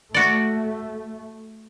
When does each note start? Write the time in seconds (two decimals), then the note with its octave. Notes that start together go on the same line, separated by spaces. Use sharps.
0.14 A3 F#4 D5